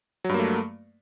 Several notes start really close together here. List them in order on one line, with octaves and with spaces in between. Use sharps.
F#3 G2 A#3 A3